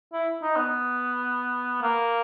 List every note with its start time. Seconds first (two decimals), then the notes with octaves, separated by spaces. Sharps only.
0.13 E4
0.42 D#4
0.56 B3
1.82 A#3